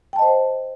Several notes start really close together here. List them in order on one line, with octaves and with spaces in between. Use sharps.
G5 A5 D#5 C5